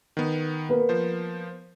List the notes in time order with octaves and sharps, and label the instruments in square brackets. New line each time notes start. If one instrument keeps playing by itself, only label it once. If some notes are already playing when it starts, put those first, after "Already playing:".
[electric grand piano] D#3 B3
[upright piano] A#3 B3 B4
[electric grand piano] F3 C5